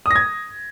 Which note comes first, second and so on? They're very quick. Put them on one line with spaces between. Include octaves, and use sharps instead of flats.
D#6 A#6 G#6